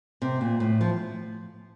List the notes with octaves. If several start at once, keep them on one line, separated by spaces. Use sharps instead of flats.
C3
A#2
A2
F3